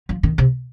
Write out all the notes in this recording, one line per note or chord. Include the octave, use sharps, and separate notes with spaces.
F3
D#3
C3